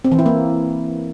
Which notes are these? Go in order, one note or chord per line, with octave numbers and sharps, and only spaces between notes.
C4
E3
E4
A#3